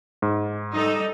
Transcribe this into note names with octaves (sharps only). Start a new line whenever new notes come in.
G#2
G3 D#4 A4